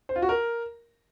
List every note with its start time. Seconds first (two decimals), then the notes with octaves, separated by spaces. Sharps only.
0.09 C5
0.16 F4
0.22 F#4
0.29 A#4